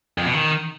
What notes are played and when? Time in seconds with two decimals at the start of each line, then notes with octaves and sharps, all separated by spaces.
0.18 F2
0.26 B2
0.34 D#3